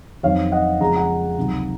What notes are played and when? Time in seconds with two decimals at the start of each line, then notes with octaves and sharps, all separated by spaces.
0.23 F2 D#3 F#3 C4 C#5 F5
0.52 D#5 F#5
0.80 F2 C#3 F3 G#3 A#5
0.96 F#5 A#5
1.37 C#2 C3 D#3 F#3